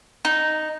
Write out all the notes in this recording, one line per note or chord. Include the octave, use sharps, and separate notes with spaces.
D#4